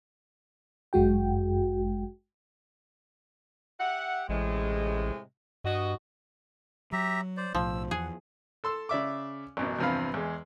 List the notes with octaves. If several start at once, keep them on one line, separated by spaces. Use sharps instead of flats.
G1 F#2 G#3 F#4 G5
G4 E5 F#5
A1 A2 C3 G#3
G2 F#4 D#5
F#3 G4 E5 A#5
C5 D5
B1 A2 F3 E6
E2 G#4 F#5
A4 C6 E6
C#3 D5 E5 D6
A1 F#2 B2
E2 G2 C3 F3 B4 F5
E2 G#3